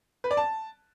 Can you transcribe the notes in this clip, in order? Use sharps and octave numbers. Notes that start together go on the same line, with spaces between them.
B4
D5
A5